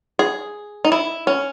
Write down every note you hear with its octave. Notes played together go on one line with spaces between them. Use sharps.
G#4
D#4
E4
C#4